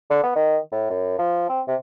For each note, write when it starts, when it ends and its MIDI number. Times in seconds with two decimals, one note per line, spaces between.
0.10 0.23 50
0.24 0.33 59
0.36 0.58 51
0.72 0.89 45
0.90 1.18 42
1.19 1.45 53
1.49 1.61 60
1.68 1.75 48